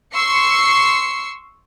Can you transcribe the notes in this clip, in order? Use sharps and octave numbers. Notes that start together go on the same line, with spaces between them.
C6 C#6 E6 C7 C#7